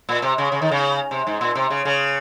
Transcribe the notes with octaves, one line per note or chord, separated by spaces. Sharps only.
A#2
C3
C#3
C#3
D#3
C#3
C3
G#2
A#2
C3
C#3
C#3